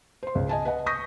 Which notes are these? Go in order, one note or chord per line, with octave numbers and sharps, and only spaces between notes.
C5 C6
C#2
D#5 G#5 A5
B4 D#5 F#5
C#6 D#6 G6 A#6 B6